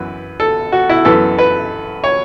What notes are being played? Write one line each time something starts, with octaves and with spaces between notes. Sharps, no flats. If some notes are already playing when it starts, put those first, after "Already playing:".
Already playing: F#2 E3 B3 B4
A4
F#4
E4
F#2 E3 B3 A4
B4
C#5